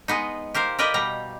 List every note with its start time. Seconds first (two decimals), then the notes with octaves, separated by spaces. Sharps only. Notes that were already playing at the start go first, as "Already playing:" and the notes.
0.08 G#3 B3 D#4
0.54 G4 A#4 C5 F5
0.79 G4 A#4 B4 D5 D#5
0.94 B2 G3 A#5